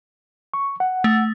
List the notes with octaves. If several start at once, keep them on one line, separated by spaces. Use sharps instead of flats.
C#6
F#5
A3